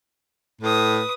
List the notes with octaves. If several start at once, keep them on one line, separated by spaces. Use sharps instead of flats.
A2 B4 D#6